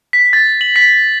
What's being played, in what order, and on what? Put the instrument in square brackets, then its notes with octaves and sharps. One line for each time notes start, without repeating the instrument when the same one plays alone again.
[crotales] B6
A6
F#7
B6